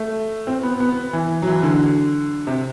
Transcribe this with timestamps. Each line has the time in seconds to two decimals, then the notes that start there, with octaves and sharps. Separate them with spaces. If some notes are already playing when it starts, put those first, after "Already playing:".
Already playing: A3
0.47 C4
0.63 B3
0.80 B3
1.13 E3
1.42 F#3
1.47 E3
1.63 D3
2.47 C3